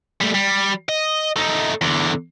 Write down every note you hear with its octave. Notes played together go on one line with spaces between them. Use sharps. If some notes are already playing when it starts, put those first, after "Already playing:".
G3 A3
G3
D#5
A3 D#4
E2 D3